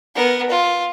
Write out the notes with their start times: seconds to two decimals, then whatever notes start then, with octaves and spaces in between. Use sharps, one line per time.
0.15 B3 A#4
0.50 F4